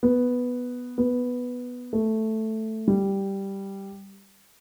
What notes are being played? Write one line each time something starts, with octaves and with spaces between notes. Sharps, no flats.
B3
B3
A3
G3